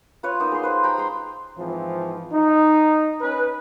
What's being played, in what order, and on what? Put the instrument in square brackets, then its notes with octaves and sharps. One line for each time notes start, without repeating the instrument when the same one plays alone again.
[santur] F4 B4 C#5
A#3 B3 D#4
G#4 C6
B4 C5
C5 G5 A#5 B5
G#3 C6
[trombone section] G#2 E3 F3 C4
D#4
C#4 D#4 B4